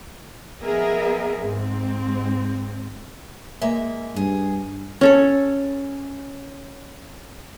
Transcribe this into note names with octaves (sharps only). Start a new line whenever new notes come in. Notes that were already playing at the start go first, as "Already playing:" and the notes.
F3 B3 G#4 A#4 D#5 E5
G#2 C4
G#3 A#3 E5
G2 G#4
C#4 A4 C#5